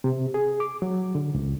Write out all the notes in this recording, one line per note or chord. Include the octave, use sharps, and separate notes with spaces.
C3
G#4
D6
F#3
D3
C#2